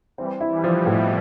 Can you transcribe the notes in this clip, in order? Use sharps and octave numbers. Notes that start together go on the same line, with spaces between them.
E3 G3 C4
E4
E3 G3
F3
B2
A2